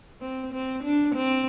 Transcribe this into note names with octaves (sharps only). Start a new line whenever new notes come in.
C4
C4
D4
C4